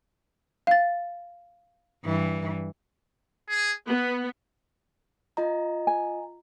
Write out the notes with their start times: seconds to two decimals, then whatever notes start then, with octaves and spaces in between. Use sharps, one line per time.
0.67 F5 A6
2.05 G2 E3
3.49 G#4
3.87 B3 B4
5.37 F4 D#5 A#5
5.87 G#5